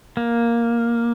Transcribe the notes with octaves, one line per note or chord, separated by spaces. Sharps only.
A#3